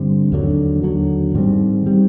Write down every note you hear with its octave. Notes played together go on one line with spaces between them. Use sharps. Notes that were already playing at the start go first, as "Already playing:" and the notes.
Already playing: G2 D3 G3 C4
D#2 D3 F#3
D#2 D3 F#3
G#2 D#3 G3 C4
D#3 G3 C4